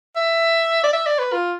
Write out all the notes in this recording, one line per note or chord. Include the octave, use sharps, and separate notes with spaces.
E5
D5
E5
D5
B4
F4